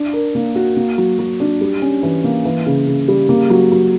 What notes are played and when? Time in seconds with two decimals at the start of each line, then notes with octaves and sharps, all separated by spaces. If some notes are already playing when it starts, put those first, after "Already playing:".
Already playing: D4
0.13 A#4
0.35 A#3
0.56 F#4
0.77 A#3
0.98 F#3
1.19 F#3
1.40 D4
1.61 G3
1.82 C#4
2.03 E3
2.24 A#3
2.45 E3
2.66 C#3
2.87 C#3
3.08 G3
3.29 A#3
3.50 F#3
3.72 F#3